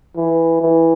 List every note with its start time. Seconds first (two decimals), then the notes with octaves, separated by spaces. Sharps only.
0.16 E3
0.61 E3